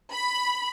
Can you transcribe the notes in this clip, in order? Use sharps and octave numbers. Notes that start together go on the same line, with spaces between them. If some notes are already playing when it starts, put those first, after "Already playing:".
B5